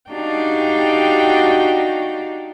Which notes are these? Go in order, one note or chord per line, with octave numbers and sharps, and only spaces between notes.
D4 D#4 F#4 G4 F5 G5